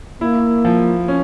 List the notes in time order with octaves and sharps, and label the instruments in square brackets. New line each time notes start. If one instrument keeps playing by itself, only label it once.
[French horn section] A#3 [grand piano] E4
[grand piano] F3
C#4